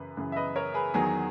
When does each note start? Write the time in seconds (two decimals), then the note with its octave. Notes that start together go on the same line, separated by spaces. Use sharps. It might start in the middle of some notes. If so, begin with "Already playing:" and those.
Already playing: F#2 C#3 E3 B4
0.17 F#2 C#3 E3
0.32 E5
0.36 B4 D#5
0.56 A#4 C#5
0.74 G#4 B4
0.94 E2 D#3 F#3 G#4